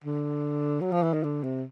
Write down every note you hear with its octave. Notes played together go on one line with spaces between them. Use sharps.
D3
F#3
F3
E3
D#3
D3
C3